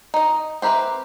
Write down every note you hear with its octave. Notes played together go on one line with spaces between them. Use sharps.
D#4 D#5
C4 G4 A#4 B4 E5